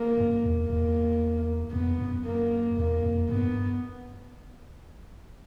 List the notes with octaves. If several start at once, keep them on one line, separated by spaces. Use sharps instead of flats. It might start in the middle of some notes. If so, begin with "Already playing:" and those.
Already playing: A#3
F#2
E2
E2 A#3
F2 B3
F#2
A#3
E2 A#3
F2
G2 B3